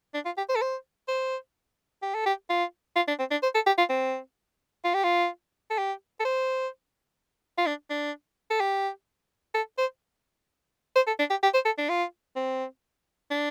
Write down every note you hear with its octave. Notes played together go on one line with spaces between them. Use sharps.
D4
F4
G4
C5
A4
C5
C5
G4
A4
G4
F4
F4
D4
C4
D4
C5
A4
G4
F4
C4
F4
G4
F4
A4
G4
A4
C5
F4
D4
D4
A4
G4
A4
C5
C5
A4
D4
G4
G4
C5
A4
D4
F4
C4
D4